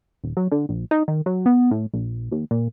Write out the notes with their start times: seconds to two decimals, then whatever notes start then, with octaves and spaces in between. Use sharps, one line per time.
0.24 D#1
0.37 F#3
0.52 D3
0.69 A#1
0.91 D#4
1.08 D#3
1.26 F#3
1.46 B3
1.71 A2
1.94 A#1
2.32 D#2
2.51 A#2